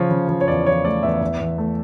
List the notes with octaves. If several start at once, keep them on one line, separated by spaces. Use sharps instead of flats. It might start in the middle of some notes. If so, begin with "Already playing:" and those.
Already playing: C#3 F3 C#5
C#3
F3
C#5
E2 D5
F3 C#5
A3 D5
E2 E5
E2
E2
A3